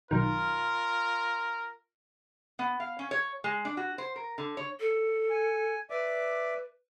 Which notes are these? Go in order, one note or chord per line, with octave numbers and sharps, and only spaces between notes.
B1 D#3 F4 A#4
B3
F5
C#4
C#5
G#3
D4
F#4
C5
A#4
D3
C#5
A4
G#5
B4 D5 E5 D6